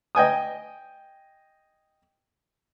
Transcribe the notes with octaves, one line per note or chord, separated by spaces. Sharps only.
D#5 G5 G#5 D#6